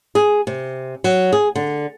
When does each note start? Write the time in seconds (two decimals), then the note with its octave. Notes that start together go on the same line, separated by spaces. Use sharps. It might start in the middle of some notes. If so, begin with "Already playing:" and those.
0.15 G#4
0.47 C3
1.04 F#3
1.33 G#4
1.56 D3